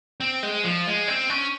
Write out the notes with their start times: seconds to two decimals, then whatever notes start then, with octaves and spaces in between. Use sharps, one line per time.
0.20 C4
0.43 G#3
0.64 F3
0.87 G#3
1.08 C4
1.30 C#4